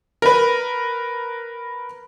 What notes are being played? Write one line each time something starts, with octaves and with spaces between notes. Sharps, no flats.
A#4 B4